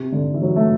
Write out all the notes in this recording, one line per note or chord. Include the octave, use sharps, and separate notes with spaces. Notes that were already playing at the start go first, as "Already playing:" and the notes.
Already playing: C3
D3
E3
F#3
A3